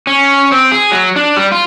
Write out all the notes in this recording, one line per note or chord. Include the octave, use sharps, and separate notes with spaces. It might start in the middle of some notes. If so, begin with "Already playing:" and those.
C#4
C4
G#4
F#3
D4
G3
F4